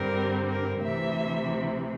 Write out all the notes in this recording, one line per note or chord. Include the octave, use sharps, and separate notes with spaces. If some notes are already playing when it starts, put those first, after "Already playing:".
Already playing: G2 D3 G3 C4 A#4
A#4
D2 C3 E3 E5